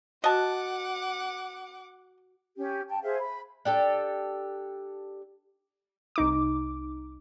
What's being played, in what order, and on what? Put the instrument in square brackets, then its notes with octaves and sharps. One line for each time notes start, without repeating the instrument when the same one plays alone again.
[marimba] F#4 F#6 [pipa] D#5 A5 [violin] F#5 D6
[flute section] C#4 G4
G5 A5
G#4 C5 E5 F5
B5
[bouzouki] D4 G4 A4
[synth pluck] C2 D#4 D6